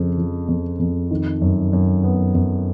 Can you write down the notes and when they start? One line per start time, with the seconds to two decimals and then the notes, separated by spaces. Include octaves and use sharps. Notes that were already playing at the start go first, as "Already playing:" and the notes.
Already playing: F2 C#3 F3 C5
0.18 F3
0.49 F2
0.79 F2
1.11 D#3
1.41 F#2
1.73 F#2
2.04 B3
2.35 F#2